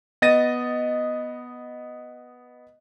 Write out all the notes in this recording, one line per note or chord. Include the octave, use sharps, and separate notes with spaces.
B3 D#5 A6 A#6 D#7